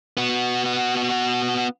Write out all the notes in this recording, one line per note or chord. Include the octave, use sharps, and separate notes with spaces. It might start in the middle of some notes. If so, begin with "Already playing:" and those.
B3 F#4